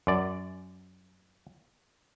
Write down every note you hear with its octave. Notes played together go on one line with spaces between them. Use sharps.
F#2 D5